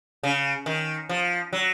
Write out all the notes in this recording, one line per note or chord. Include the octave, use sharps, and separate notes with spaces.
C#3
D#3
F3
F#3